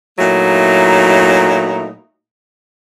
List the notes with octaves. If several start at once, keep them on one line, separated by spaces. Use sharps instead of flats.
A#2 F#3 A3 D#4 E4